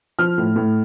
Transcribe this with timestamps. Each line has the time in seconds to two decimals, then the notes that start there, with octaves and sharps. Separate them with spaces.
0.19 F3 F6
0.38 A2
0.56 A2